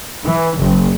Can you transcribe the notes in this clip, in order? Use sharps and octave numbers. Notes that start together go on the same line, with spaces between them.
E3
F#1